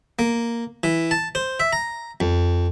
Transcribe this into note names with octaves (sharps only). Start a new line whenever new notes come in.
A#3
E3
A5
C5
E5
A#5
F2